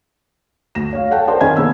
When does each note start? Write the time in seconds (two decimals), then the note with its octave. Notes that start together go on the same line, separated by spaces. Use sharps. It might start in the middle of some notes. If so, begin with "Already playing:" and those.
0.75 D2 A#6 E7
0.93 C#5 F5
1.11 A4 C#5 F#5 G5 A5
1.27 A#4 C5 D5 G5 A5
1.41 D#3 C#4 G#4 C5 G#5 G#6
1.57 C#3 A#3 B3 E6